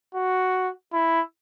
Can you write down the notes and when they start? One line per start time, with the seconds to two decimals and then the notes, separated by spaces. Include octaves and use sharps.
0.14 F#4
0.93 E4